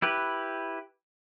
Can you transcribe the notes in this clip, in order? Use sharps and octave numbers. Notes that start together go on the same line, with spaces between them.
E4 G4 B4